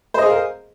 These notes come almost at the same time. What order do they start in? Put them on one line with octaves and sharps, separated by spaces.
C5 D#5 G#4 F5 A#4